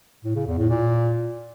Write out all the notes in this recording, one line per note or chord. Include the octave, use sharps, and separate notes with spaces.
A2
C#3
E2
A2
A#2